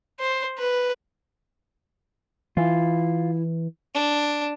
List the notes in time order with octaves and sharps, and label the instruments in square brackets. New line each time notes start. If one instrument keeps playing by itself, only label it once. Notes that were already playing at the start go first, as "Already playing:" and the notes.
[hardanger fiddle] C5
B4
[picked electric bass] E3 [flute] E4 [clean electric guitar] F4
[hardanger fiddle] D4